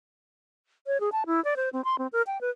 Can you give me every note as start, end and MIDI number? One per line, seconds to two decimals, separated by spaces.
0.87 1.00 73
1.00 1.09 68
1.12 1.24 81
1.26 1.43 64
1.45 1.54 74
1.56 1.69 72
1.73 1.84 60
1.85 1.96 84
1.99 2.07 60
2.13 2.22 70
2.27 2.40 79
2.41 2.50 71